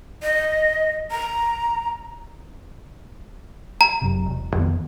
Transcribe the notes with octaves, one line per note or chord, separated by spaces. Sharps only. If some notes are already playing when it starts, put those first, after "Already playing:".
D#5
A#5
A#5
F#1 F#2 C3
E1
F2 D#3 B3